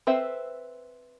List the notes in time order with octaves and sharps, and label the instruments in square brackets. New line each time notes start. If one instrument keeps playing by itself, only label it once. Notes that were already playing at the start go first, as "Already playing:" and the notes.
[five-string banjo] C4 A4 B4 C5 E5